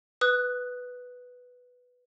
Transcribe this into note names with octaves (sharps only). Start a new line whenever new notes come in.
B4 D#6 F#6